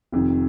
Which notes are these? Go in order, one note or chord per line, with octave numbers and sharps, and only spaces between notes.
F1 F2 D#3